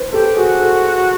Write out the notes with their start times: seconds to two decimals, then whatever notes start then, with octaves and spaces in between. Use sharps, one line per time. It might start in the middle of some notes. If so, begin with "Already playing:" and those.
Already playing: B4 C5
0.13 G4 A4
0.36 F#4 G#4
0.60 A4